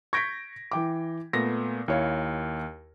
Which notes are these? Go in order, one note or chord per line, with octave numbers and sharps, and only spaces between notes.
C#6 G6 G#6 A#6 B6 D7
E3 G5 D6
A#2 A3 B3 A#6
D#2 E4 C#5 F5